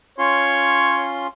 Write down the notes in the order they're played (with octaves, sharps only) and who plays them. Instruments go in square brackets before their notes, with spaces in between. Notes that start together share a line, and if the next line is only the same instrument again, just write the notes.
[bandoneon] C#4 F4 C6 [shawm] C#5